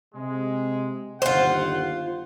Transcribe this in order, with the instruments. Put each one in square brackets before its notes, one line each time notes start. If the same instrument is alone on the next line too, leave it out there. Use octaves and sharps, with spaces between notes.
[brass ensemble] C3 G#3
[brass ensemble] G1 D#2 F#5 [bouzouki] F4 C5